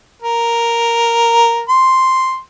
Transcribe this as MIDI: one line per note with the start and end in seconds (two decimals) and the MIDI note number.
0.22 1.63 70
1.69 2.39 84